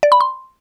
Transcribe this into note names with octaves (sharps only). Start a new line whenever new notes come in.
D5
B5
C6